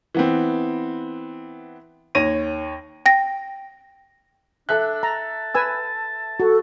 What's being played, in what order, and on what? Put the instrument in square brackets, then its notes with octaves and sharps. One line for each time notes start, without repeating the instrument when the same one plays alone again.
[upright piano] E3 B3 C4
D#2 C#5 A#6 D#7
[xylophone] G5 A#6
[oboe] D4 [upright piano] A4 E5 F#6
[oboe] A5 [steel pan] A#5
[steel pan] B4 G#5 E6
[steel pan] F#4 [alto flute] A4